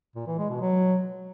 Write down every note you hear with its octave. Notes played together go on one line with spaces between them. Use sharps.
A#2
E3
G#3
B2
F#3